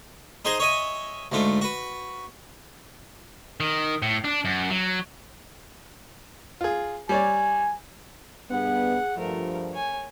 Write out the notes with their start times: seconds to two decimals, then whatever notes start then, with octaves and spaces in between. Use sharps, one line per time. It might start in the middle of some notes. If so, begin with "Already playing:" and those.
0.45 D#4 G#4 C5 D#5 G#5 A#5
0.60 C#5 D#5 E5 G#5
1.32 D2 G#2 A3 F4
1.61 F#4 B4
3.60 D#3
4.02 A2
4.24 D4
4.45 F#2
4.70 F#3
6.61 F4 G#4
7.09 G3 C#5 D5 G#5
8.50 G2 B3 G#4 F#5
9.17 G2 F3 A3 A#4
9.72 C#5 G#5